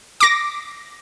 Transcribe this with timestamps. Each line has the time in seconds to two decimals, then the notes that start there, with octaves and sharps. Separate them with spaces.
0.20 D6 A#6